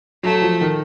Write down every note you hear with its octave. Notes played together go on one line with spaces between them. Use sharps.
F#3 A3
F3
D#3